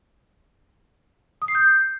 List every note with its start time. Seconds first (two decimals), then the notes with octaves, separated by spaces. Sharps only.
1.42 D#6
1.48 C7
1.55 G6